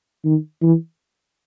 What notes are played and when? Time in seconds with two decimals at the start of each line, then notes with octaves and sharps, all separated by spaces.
0.25 D#3
0.62 E3